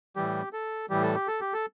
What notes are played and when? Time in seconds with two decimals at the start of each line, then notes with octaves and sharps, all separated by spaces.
0.16 A2 E3 G3 G4
0.53 A4
0.90 A2 E3 G3 G4
1.03 A4
1.15 G4
1.28 A4
1.41 G4
1.53 A4